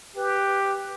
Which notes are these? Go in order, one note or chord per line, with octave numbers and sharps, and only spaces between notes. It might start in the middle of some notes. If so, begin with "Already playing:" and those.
G4 B4